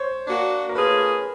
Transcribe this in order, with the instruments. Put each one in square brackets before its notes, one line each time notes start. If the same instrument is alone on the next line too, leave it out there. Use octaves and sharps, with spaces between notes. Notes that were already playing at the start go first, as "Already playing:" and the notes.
Already playing: [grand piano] C5 C#5
[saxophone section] A#3 D4 F#4
[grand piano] A#4
[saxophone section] A3 C#4 F4 G#4 [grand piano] B4